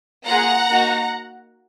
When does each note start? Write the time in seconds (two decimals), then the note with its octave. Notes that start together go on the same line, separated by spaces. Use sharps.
0.25 A#3 F4 G#4 F#5 A#5
0.70 A#3 D#4 F#4